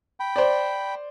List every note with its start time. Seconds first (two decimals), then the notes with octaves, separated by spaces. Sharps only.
0.20 G5 B5
0.36 C5 D5